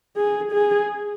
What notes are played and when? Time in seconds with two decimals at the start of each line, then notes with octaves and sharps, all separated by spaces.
0.16 G#4
0.52 G#4